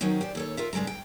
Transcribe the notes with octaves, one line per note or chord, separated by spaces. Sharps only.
D#3 F#3 C4 C#4 D#4
G4 C5 D5
D#2 A4 C#5
F4 A#4 E5
G2 C#3 G#3 A4 A#5
G5